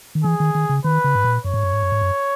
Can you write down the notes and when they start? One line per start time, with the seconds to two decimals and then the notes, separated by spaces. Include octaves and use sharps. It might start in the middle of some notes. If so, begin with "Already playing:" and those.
0.15 D#3
0.24 E3 G#4
0.40 D#3
0.55 D#3
0.69 C#3
0.84 D#3 B4
1.04 C#3
1.15 G#2
1.24 A#2
1.44 F#2 C#5
1.54 G#2
1.63 F#2
1.73 G#2
1.83 F#2
1.92 G#2
2.02 F#2